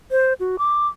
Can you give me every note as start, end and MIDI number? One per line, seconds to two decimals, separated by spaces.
0.11 0.33 72
0.40 0.56 66
0.59 0.87 86